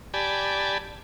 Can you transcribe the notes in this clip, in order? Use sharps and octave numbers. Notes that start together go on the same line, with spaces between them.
G4 D5 G#5 A5 B5